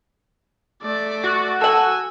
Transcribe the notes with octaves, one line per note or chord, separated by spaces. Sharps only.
A3 D5
F#4
A4 F#5 G#5 E6